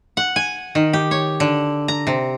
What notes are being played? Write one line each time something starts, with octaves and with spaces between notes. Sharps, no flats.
F#5
G#5
D#3
G4
C#5
D3
A#5
C3